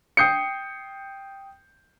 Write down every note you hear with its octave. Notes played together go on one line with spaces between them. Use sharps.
G5 D#6 G6 C7 C#7